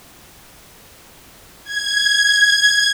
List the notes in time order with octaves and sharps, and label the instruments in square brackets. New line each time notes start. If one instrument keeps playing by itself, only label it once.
[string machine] G#6